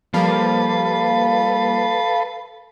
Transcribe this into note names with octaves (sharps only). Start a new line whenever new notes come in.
F3 G3 A#3 A4 B4 F5